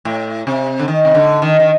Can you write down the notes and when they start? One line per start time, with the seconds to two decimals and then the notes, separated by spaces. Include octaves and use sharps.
0.05 A2
0.47 C3
0.79 D3
0.88 D#3
1.05 C3
1.15 D3
1.42 D#3
1.60 D#3